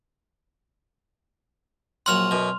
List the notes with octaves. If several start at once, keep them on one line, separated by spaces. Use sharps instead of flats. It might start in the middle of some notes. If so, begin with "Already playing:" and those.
A#1 F#3 F#5 C6 F6 F7
F#2 B2